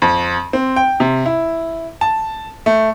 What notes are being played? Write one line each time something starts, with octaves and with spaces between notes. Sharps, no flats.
F2
C4
G5
C3
E4
A5
A3